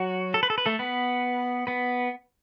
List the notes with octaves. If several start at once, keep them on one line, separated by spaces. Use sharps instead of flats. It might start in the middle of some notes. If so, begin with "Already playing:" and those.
Already playing: F#3 F#4
A4
B4
A4
B4
A3 A4
B3 B4
B3 B4